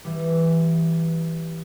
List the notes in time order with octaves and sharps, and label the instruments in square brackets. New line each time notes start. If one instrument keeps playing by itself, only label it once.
[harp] E3 G3